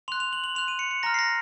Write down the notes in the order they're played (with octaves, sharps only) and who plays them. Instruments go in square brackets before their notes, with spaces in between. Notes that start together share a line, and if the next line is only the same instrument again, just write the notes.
[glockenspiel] C6 F#6 F7
F7
F#7
F#7
C6 F#6 F7
D#7
C#7
C#7
A#5 F6 A#6
C7
A#6